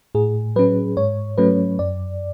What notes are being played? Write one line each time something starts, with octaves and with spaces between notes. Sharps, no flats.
A2 G#4
F#3 C#4 B4
G#2 C#5
F#3 A3 C#4 B4
F#2 D5